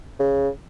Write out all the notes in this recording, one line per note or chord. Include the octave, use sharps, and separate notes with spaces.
C#3